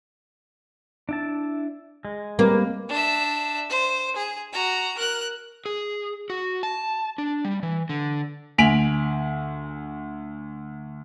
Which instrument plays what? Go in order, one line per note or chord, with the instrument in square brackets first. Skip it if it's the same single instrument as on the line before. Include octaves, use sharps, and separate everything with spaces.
[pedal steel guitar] D4 E4 A5
G#3
[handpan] G3 C4 B4 [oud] A#3
[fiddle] D4 E5
C5
G#4
F#4 A#5
A#4 F#6
[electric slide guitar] G#4
F#4
A5
D4
G3
E3
D3
[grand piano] D2 G#5 B6 D7 F7 F#7